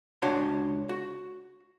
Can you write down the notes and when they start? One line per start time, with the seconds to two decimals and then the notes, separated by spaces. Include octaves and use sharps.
0.22 C#2 D4 F#4 C#5 G#5 C6
0.89 F#4